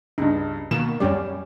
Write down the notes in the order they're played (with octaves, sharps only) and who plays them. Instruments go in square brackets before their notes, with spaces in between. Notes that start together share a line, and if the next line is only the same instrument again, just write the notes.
[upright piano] C#2 G2 [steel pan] D#4
[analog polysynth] B2 D#3 A#3 [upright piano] E7
[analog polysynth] F#2 G3 [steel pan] C#4 G4 D5